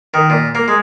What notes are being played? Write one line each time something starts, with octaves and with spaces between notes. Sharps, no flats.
D#3
A#2
A#3
G#3